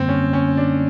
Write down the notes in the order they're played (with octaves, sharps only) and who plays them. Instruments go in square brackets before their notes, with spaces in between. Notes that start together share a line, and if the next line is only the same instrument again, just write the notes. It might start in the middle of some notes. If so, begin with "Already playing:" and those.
Already playing: [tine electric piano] F#2 D3 G3 A#3 [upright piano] C4
[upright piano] C#4
C#4
D4